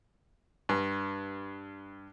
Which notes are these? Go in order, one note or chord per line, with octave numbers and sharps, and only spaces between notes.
G2